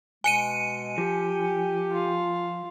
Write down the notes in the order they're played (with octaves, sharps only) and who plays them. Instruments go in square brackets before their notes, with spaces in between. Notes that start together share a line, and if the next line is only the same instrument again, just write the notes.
[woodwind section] B2 G#3 [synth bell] G#5 C#7 D#7
[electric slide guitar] F3 [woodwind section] G4
[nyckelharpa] F4 F5